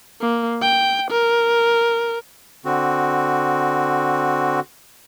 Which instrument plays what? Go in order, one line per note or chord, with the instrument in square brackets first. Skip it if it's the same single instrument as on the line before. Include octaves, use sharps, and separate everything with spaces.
[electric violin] A#3
G5
A#4
[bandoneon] D3 C4 F#4